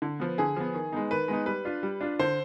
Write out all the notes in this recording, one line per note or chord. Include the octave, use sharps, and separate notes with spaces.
D3
F3 B3
D3 G#4
F3 B3
D#3
G#3 B3 D#4
D#3 B4
G#3 B3 D#4
G3 B4
D4 F4
G3
D4 F4
D3 C5